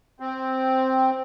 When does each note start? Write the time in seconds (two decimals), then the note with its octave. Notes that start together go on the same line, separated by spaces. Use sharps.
0.20 C4